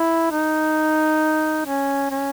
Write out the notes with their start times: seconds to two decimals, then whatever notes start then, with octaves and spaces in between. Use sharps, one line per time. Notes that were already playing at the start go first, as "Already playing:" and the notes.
Already playing: E4
0.32 D#4
1.65 C#4
2.11 C#4